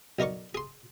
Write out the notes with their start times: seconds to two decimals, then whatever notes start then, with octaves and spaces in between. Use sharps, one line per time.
0.19 B1 D#4 A#4 D5 C#6
0.55 G#4 C6